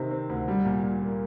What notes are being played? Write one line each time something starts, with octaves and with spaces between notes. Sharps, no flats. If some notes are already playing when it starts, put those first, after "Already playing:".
Already playing: C3 D#3 C4
C4
D2
G3
A#2
A#2
A#3